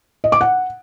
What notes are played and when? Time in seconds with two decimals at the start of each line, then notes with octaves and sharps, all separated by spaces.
0.24 D#5
0.32 D6
0.41 F#5